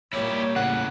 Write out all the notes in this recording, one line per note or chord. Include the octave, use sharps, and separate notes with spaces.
A#2 G3 A#3 E4 G4 C#5
A2 C#3 F#5